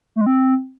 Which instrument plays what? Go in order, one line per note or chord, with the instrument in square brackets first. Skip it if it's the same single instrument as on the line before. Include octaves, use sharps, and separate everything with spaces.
[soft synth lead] A3
G#3
C4